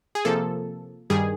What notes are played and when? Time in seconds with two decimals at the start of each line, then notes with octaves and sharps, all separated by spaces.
0.15 G#4
0.25 C3 F3 A#3 A4
1.10 G2 D#3 G3 G#4